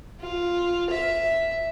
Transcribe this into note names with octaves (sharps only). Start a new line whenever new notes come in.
F4
E5